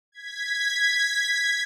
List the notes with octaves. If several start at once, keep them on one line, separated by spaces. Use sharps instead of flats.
G#6 B6